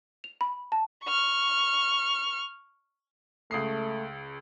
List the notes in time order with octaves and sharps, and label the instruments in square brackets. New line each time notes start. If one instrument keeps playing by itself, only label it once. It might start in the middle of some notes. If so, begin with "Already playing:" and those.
[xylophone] F7
B5
A5
[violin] C#6 F6
[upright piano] C#2 D#6 C7 [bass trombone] A3